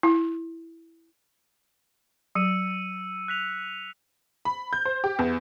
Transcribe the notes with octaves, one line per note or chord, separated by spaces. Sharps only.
E4
F#3 E6 C#7 D#7
F#6 B6 F7
B5
G6
C5
G4
E2